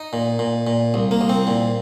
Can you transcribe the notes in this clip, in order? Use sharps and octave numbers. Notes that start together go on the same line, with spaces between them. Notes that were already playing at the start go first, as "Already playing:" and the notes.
Already playing: D#4
A#2
A#2
A#2
C2
A#3
C2
C4
A#2